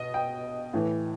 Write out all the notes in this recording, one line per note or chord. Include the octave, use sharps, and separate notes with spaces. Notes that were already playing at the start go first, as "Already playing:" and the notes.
Already playing: B2 D#5
G5
A2 E3